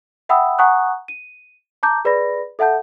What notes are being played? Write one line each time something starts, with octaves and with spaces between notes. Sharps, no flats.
E5 F#5 G5 B5 D#6 E6
F#5 G#5 A#5 C#6 D#6 F#6
D#7
A5 A#5 D6 G6
G#4 B4 D5 B5 A#6
A4 E5 F#5 A5 G6